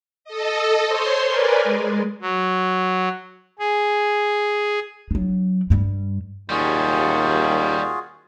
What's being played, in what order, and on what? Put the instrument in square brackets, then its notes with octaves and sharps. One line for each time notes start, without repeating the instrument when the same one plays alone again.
[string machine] A4 D#5
C5 C#5 C6
A#4 B4 D5 G#5
G#3
[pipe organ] F#3
G#4
[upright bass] F#3 D4
G2 G3
[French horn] D#2 [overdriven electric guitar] G3 C#4 [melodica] F4 F#4 G#4